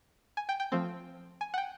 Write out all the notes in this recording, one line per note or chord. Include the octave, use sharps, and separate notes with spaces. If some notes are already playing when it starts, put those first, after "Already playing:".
G#5
G5
G5
F3 A3 C4
G#5
F#5
G5